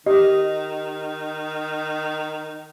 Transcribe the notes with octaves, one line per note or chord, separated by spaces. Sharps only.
D#3 G4 D#5